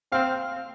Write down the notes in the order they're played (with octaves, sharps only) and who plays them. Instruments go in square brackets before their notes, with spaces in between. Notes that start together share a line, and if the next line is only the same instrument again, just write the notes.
[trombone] C4 [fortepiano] F5